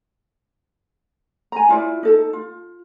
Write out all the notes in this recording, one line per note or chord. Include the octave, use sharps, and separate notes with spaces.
G#5 A#5
E4 F4 D5
D#4 A4 A5
F4